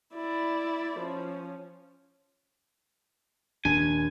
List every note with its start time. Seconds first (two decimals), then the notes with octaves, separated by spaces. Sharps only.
0.14 E4 D5
0.99 F3 C#4
3.65 D#1 D#2 D4 G#5